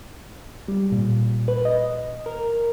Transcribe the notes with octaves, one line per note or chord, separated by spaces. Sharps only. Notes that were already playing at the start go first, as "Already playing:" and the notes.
G3
A#2
B4
D#5
A#4